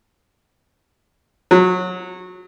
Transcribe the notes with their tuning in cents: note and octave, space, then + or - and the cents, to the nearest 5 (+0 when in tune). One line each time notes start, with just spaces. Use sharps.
F#3 -25